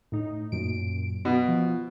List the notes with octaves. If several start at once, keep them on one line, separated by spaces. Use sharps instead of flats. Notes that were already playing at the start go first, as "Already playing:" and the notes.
A2 D#4
F#2 A#2 D7
B2
F3